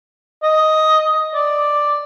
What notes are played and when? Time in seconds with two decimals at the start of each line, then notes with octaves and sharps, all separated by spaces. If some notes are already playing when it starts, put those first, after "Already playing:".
0.43 D#5
1.34 D5